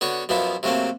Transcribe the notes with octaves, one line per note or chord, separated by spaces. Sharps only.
D3 B3 F#4 C#5
F#2 B2 F3 B3 E4
C3 F#3 A3 A#3 C4